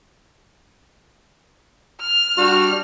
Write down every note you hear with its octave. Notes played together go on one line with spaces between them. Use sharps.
F6
G3 D4 F#4